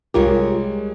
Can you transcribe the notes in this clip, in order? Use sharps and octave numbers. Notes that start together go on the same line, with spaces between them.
C2 G3 G#3 F4 G4 A#4 C#5